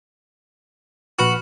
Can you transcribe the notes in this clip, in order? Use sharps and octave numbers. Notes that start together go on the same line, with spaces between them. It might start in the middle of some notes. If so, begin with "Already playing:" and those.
A#1 F#4 B4 F6